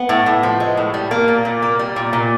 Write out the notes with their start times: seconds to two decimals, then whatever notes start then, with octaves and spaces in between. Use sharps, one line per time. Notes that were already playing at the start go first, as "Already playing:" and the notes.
Already playing: B3
0.09 A2
0.26 A2
0.43 F3
0.60 G#3
0.77 A2
0.94 G3
1.11 A#3
1.28 A#2
1.45 A#2
1.62 A#3
1.79 G3
1.96 A#2
2.13 A#2